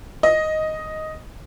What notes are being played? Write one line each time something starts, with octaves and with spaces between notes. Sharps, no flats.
D#5